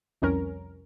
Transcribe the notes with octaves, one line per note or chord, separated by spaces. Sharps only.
C2 F2 C#4 A#4